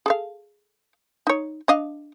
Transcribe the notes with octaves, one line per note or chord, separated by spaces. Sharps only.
G#4 A4 F5
D#4 C#5
D4 D#5 F5